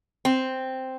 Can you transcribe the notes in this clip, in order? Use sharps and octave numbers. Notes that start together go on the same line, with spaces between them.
C4